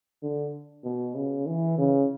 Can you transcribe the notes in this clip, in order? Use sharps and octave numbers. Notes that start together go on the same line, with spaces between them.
D3
B2
C#3
E3
C#3